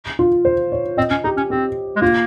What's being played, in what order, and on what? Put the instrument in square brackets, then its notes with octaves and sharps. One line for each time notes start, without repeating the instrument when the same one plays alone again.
[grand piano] F4
C5
C#5
[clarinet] C4 [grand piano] D#5
[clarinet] C#4
[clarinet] D#4 [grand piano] G4
[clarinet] C#4
[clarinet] C4 [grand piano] G4
[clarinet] G#3
[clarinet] A#3 [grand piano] F4